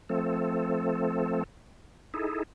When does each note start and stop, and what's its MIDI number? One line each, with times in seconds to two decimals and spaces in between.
0.09 1.43 53
0.09 1.43 57
0.09 1.43 60
0.09 1.43 69
2.14 2.43 63
2.14 2.43 64
2.14 2.43 68
2.14 2.43 69